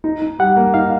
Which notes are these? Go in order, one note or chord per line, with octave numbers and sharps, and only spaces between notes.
D#4
D#4
G3 F#5
A#3
D#4 F5